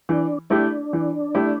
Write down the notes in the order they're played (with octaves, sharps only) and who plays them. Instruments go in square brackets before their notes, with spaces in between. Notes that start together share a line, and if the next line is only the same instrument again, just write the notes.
[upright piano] E3 [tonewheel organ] D4
[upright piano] A3 E4 G4 [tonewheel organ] D4
[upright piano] E3
A3 E4 G4